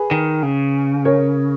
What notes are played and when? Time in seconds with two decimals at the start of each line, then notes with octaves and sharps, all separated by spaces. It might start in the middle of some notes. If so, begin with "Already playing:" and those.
Already playing: G#4 B4
0.11 D#3
0.43 C#3
1.05 A#4 C#5